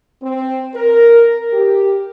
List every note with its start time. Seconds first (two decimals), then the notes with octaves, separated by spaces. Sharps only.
0.22 C4
0.74 A#4
1.52 G4